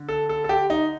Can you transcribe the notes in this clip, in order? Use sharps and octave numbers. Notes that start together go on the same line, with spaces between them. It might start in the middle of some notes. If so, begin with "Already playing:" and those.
Already playing: D3
A4
A4
A4
G4
D#4